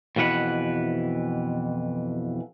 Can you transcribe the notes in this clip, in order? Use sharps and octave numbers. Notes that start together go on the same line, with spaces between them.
F2 B2 E3 B4 F#5